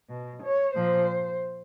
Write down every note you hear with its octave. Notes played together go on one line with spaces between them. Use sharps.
B2
C#5
A#2 F3 C5